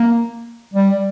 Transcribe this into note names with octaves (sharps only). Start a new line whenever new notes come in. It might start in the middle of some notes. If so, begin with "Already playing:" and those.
Already playing: A#3
G3